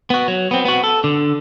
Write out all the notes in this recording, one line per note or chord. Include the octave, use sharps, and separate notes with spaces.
B3 F#4
F#3
B3 C4
B3 F#4
A4
D3